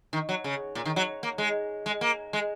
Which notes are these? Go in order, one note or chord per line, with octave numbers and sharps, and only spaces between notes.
D#3
F#3
C#3
A#2
D#3
F#3
A#3
G#3
G#3
A#3
G#3